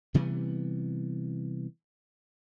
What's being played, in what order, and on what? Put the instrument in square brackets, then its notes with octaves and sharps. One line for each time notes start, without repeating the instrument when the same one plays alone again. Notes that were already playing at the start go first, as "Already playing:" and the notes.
[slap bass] C3 E3 G3 B3